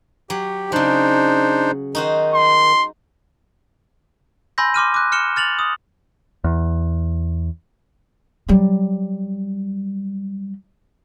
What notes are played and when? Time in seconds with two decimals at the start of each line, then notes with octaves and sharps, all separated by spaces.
0.30 F#3 G4
0.72 C#3 F#3 D4 D#4 C5
1.95 D#3 D#4 F#4 C5
2.34 C6
4.58 G#5 B5 C6 E6 G6 A#6
4.74 C6 D6 F6 D#7
4.94 D6 F#6
5.12 F6 C#7 E7 G7
5.36 F6 A6 F7 F#7
5.59 D#6
6.44 E2
8.48 F#3 G3